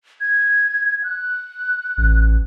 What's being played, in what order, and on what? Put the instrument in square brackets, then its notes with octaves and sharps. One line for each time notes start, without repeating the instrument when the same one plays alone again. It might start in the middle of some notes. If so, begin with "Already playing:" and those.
[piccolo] G#6
F#6
[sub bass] A1